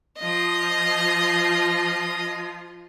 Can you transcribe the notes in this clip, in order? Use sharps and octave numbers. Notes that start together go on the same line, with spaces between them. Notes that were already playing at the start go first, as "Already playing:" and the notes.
F3 F4 D#5